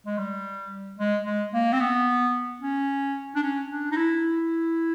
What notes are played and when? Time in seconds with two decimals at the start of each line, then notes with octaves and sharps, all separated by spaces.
0.06 G#3
0.18 G3
0.99 G#3
1.26 G#3
1.54 A#3
1.73 C4
1.81 B3
2.62 C#4
3.36 D4
3.43 C#4
3.70 D4
3.92 D#4
3.97 E4